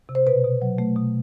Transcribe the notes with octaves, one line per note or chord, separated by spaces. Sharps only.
C3
C5
B2 B4
B2
F#3
A3
B2